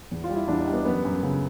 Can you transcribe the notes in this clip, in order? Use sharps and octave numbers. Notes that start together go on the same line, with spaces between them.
E2
F4
G3
E4
E2 D4
D#4
G3
B3
F#2 B3
F#2
C#3